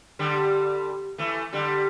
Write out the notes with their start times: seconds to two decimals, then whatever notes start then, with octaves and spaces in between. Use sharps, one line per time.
0.19 D3 G3
1.18 E3 A3
1.53 D3 G3